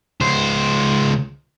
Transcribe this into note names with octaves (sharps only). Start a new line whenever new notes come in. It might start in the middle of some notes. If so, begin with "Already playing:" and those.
C#2 C5